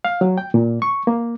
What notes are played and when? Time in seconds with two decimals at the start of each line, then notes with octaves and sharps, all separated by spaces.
0.05 F5
0.21 F#3
0.38 G5
0.54 A#2
0.82 C#6
1.07 A#3